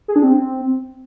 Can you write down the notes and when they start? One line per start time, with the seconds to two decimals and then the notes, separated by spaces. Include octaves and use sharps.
0.08 G#4
0.16 D4
0.23 C4